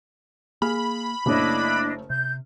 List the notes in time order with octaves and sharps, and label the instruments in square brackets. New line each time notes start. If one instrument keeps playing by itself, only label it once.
[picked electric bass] A#3 [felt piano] G#4 F6 [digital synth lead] B5
[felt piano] F#1 A3 C#5 [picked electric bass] A#3 [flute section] D4 E4 D#5
[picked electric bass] C3 [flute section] G6